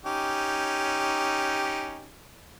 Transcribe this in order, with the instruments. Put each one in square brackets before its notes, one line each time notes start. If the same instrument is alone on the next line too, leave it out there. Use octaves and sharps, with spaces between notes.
[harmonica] C#4 D#4 G4